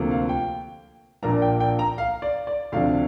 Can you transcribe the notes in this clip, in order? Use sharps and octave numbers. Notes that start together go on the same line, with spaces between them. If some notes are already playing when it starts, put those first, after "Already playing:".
Already playing: D2 C3 F3 A#3
F5
G5
A#1 A#2 A#3 D4 A#5
G5
G5
A#5
F5
D5
D5
D2 C3 F3 D4 F5